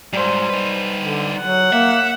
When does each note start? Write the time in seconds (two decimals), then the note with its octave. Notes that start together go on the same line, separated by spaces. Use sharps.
0.13 G#2 F#3 G3 C5
0.49 D#4 B4
1.00 D3
1.42 F#3 F#5
1.73 A#3 E5